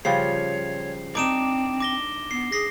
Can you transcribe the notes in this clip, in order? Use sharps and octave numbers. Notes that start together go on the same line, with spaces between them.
C#3 F3 G3 C#5 C7
C4 D4 D#4 D6 D7 E7
D6 A#6 G7
B3 C7
G#4 A#6 C7